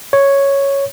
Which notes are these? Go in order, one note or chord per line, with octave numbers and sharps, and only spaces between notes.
C#5